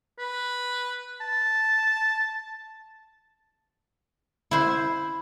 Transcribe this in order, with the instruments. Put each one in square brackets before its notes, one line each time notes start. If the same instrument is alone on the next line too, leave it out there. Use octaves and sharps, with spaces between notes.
[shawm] B4
A5
[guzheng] E4 C5